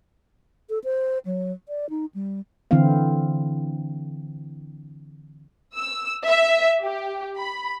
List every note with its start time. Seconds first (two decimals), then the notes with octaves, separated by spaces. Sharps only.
0.70 A4
0.84 C5
1.25 F#3
1.68 D5
1.90 D#4
2.15 G3
2.71 D3 E3 C4 E4 F5
5.75 E6
6.26 E5
6.83 G4
7.38 B5